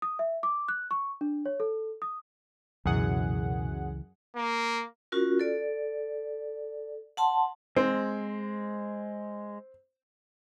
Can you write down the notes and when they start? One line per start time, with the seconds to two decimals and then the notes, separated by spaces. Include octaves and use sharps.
0.02 D#6
0.19 E5
0.43 D6
0.68 F#6
0.91 C#6
1.21 D4
1.46 C#5
1.60 A4
2.02 D#6
2.86 C#2 F#2 B2 E3 G#4 F#5
4.36 A#3
5.12 C#4 F4 F#4 A#4
5.40 A4 D5
7.17 F#5 A5 C6
7.77 G#3 C4